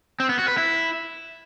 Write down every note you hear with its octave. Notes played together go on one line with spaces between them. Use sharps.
C4
B3
F#4
B4
E4